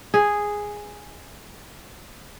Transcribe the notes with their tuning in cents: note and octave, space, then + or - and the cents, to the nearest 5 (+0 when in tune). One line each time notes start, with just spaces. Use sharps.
G#4 -5